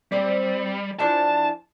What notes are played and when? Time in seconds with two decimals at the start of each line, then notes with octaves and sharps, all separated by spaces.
0.12 G3 C4 D5
0.99 E3 F3 D4 A5